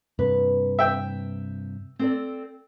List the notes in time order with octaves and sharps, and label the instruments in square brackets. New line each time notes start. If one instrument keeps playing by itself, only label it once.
[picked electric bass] G2 C3 [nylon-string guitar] B4
[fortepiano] E5 G5
[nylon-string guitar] C4 A4 D5